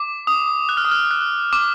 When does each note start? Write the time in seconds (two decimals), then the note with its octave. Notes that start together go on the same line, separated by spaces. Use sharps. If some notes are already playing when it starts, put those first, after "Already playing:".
Already playing: D6
0.27 D#6
0.69 F#6
0.77 F6
0.85 D#6
0.91 F6
1.11 F#6
1.53 D6